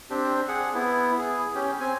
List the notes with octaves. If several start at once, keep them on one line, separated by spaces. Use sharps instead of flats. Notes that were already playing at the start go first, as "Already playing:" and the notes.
C4 D4 G4
G#4 F#5
B3 E4
G#4
C#4 G4
C4 G#5